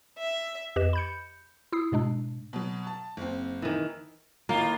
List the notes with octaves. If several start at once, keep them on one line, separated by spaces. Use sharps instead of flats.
E5
F2 G4 B4 D#5 E7
B5 G6 C#7
E4 D#6 E6 C7
G#2 B2 G#3 D4
B2 F#3
A5
F#1 C4
D#3 E3
A2 D#3 A#3 F4